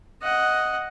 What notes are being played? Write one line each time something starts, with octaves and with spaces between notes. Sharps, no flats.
D#5 F#5